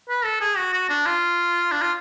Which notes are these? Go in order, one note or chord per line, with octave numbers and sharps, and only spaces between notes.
B4
A4
G#4
F#4
F#4
D4
F4
D4
F4